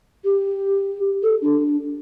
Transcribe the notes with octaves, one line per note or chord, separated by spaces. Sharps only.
G4
A4
D4